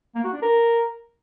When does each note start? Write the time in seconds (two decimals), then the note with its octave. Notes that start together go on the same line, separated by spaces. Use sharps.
0.15 A#3
0.24 F#4
0.33 D4
0.42 A#4